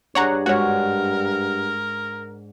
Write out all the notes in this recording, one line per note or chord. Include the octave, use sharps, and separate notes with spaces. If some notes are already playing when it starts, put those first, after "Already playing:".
G2 D4 G#4 C#5 F#5 A#5
G#2 F#4 A#4 C#5 F#5